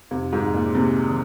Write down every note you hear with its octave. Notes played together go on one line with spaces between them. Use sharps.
F2 C3
G#2
F2
A#2
C3 A#3
D#3